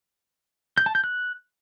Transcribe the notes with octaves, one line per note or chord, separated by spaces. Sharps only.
G6
A5
G6
F#6